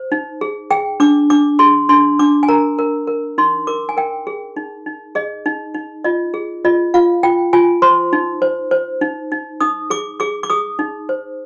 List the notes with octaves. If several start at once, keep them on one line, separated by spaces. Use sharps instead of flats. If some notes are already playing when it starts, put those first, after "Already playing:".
Already playing: C5
D#4
G#4
G#4 G5
D4 D6
D4 D6
G#4 C6
D4 C6
D4 D6
G#5
A#4 A#5
A#4
A#4
D#4 C6
A#4 D6
G#5
A#4 G5
G#4
D#4
D#4
G#4 D#5
D#4
D#4
F4 D#5
G#4
F4 D#5
F4 F5
F4 G5
F4 G#5
C5 C6
D#4
C5
C5
D#4
D#4
D#4 D#6
G#4 D6
G#4 D6
D6
G#4 D#6
D#4
C5